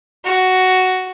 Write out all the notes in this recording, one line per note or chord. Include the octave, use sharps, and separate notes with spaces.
F#4